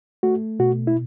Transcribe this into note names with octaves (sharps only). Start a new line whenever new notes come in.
A3 F#4
B2 F#4
E4